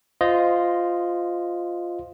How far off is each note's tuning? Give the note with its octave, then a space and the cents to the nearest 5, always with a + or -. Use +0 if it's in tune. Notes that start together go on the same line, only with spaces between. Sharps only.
F4 +0 C5 -20 D#5 +0